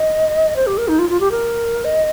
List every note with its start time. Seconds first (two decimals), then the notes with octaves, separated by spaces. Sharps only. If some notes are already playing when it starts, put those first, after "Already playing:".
Already playing: D#5
0.56 C5
0.67 G4
0.78 A#4
0.88 D#4
0.99 F4
1.10 F4
1.20 G4
1.31 A#4
1.85 D#5